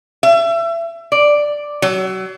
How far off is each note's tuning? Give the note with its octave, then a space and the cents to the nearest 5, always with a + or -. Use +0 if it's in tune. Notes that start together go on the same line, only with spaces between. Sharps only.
E5 +30
D5 +5
F#3 +30